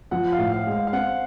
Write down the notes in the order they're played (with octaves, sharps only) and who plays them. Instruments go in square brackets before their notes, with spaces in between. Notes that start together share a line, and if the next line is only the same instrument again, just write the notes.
[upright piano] F3 [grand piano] F#5
[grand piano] F5
[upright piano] A2
[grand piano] F5
[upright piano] G#3
[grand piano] F5
F5
[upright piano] C4 [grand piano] F#5